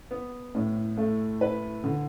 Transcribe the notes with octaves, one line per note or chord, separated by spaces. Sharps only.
B3
A2
A3
B4
D3